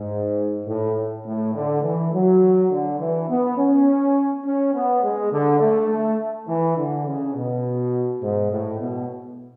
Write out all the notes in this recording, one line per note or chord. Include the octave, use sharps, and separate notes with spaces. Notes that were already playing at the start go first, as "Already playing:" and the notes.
Already playing: G#2
A2
A2
D3
E3
F#3
D3
E3
B3
C#4
C#4
B3
G#3
D3
A3
A3
E3
D3
C#3
B2
G#2
A2
B2